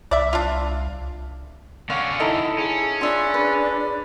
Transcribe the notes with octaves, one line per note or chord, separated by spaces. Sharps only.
C2 D5 E5
D4 F4
D3 C#4 C#5 F5 F#5
D#4 E4 A4
C#4 G#4
D4 F4 E5 B5
B4